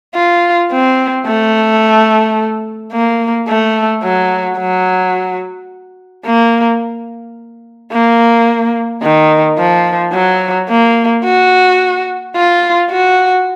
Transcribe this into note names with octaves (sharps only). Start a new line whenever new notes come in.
F4
C4
A3
A#3
A3
F#3
F#3
A#3
A#3
D#3
F3
F#3
A#3
F#4
F4
F#4